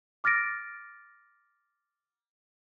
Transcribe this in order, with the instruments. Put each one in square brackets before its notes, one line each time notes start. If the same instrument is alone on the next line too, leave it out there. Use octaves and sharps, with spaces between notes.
[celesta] D6 F6 A6 A#6 D7